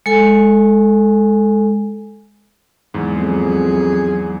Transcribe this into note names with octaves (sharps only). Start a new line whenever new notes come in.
G#3 A4 G#5
E2 G#2 F#3
F2 G#4